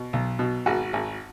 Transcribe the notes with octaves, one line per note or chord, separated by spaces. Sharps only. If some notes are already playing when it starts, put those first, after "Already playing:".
Already playing: B2
B1
B2
G#1 F#4
G#1